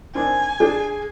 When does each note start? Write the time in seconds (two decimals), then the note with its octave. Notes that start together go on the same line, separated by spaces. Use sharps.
0.15 D#3 C4 D4 G#5
0.60 D4 G#4